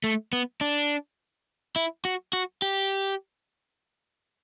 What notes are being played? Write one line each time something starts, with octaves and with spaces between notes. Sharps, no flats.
A3
B3
D4
E4
F#4
F#4
G4